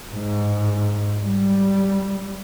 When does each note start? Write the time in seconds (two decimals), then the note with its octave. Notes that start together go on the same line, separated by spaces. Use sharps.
0.12 G#2
1.23 G3